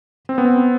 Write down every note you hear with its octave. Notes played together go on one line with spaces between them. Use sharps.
C4
B3
C4